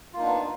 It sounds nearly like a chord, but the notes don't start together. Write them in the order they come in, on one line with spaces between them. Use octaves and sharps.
F4 A#3 D#4 D4 B3